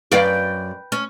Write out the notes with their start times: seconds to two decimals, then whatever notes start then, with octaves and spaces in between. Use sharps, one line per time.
0.12 F#2 B4 D5 F5 G5
0.92 C#4